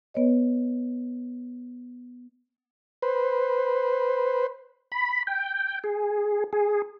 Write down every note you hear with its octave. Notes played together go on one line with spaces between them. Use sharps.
B3 B4 C#5 D#5
B4 C5
B5
G5
G#4
G#4